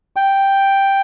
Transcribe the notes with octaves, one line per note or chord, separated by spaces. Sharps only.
G5